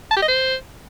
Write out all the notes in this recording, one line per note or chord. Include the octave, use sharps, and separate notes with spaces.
A5
G4
D#5
C5